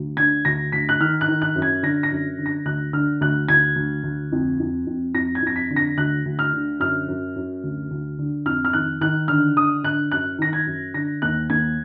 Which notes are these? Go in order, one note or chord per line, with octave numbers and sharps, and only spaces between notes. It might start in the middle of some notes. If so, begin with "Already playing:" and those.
Already playing: D2
D3 G#6
D2 A#6
D2 B6
F#6
D#3 F6
F#6
D#3
F#6
F#2
G#6
D3 A#6
A#6
F#2
D3
A#6
D2 F#6
D3 F6
D2 F#6
D2 G#6
D2
D2
F2
F2
F2
F2 A#6
G#6
F2 A#6
B6
D3
A#6
D2 F#6
D2
F6
D3
F#2 F6
F#2
F#2
D2
D2
D3
F2 F6
F6
D#3 F#6
D#3 F#6
D3 F6
D3 D#6
D3 F#6
F#2 F#6
D#3 A#6
G#6
F#2
D3 A#6
D#2 F#6
D#2 G#6